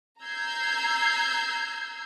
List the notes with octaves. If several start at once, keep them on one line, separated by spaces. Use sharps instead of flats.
A#5 E6 G6 G#6 C7